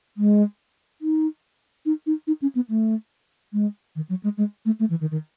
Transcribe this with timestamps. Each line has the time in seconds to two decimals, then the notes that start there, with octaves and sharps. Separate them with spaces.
0.17 G#3
1.02 D#4
1.86 D#4
2.07 D#4
2.27 D#4
2.42 C#4
2.55 B3
2.69 A3
3.53 G#3
3.96 D#3
4.09 F#3
4.23 G#3
4.38 G#3
4.65 A3
4.80 A3
4.90 E3
5.01 D#3
5.11 D#3